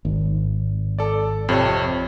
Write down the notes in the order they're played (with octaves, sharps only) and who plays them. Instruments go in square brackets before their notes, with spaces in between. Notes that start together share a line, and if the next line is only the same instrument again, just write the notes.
[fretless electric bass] G#1
[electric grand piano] A4 D5
F2 C3 C#5